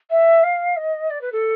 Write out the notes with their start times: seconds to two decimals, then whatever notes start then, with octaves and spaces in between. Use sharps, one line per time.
0.10 E5
0.43 F5
0.76 D#5
1.10 D5
1.21 B4
1.32 A4